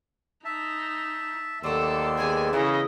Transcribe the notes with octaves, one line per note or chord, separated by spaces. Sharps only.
D#4 E5 A5
D#2 F#3 A3 A4 D5 C6 E6
G#3 B3 G#4 G#5
E2 C#3 A#3 E4 D#5